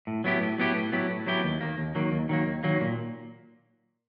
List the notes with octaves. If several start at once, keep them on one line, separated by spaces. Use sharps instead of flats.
A2
F#3 B3 E4 G4
A2
F#3 B3 E4 G4
A2
F#3 B3 E4 G4
A2
F#3 B3 E4 G4
D#2
D#3 F#3 A#3
D#2
D#3 F#3 A#3
D#2
D#3 F#3 A#3
D#2
D#3 F#3 A#3
A#2